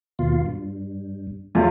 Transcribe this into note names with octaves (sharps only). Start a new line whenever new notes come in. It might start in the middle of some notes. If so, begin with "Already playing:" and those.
D#2 B2 F4
G2
E2 F#3 A3 F4